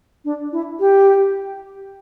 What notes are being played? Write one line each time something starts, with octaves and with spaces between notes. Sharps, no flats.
D4
E4
G4